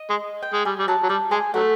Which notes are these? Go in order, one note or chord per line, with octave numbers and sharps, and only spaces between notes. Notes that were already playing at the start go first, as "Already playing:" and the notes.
Already playing: D#5
G#3
G5
G#3
G3 G#5
G3
F#3 A5
F#3
G3 A5
G#3 G#5
F#3 A3 F#5